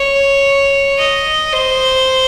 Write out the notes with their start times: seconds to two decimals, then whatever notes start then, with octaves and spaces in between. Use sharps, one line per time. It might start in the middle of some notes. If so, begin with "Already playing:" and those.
Already playing: C#5
0.98 D#5
1.52 C5